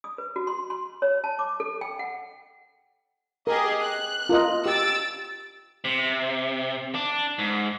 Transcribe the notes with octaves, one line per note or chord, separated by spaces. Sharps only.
D#6
B4
F#4
C6
C6
C#5
A5
D6
A4
G5
F#5
G4 G#4 A#4 D#5
F#6
F4 A#4 D#5
G4 E6 A6 D7
C3
D4
G#2